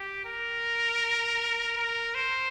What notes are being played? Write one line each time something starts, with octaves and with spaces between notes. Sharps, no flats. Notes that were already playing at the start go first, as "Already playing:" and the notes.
Already playing: G4
A#4
A#4
C5